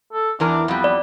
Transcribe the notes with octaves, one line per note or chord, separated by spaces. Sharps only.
A4
E2 E3 D4 A#4
F2 G3 B3
D5